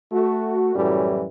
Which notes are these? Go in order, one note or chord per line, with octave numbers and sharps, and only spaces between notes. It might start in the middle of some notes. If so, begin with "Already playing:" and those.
A3 F#4
F#2 A2 E3 F#3 G3